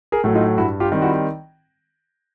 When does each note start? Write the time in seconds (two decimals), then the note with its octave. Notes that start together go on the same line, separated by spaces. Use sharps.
0.12 G#4 A#4
0.24 A2 F#3 A3
0.35 D#4 F4
0.58 G2 E4 F#4
0.80 F4 G4
0.92 D#3 G3 C4
1.02 E4 F#4